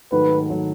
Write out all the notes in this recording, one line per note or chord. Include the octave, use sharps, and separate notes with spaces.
G#2 D#3 F#3 A3 B4
D#3 F#3 A3